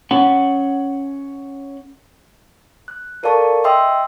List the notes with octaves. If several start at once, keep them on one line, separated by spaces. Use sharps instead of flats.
C#4 F#5
F#6
A4 A#4 D5 F5 A5 C#6
D#5 E5 G5 C6 D#6 E6